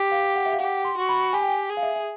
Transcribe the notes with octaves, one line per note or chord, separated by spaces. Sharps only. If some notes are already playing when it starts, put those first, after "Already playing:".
Already playing: G4
F5
F#5
E5
F5
G4 F#5
C6
F#4
B5
G4 G#5
G5
G#5
G#4
F5
E5
E5